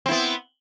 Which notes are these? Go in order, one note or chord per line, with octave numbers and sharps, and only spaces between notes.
B3 C4 E4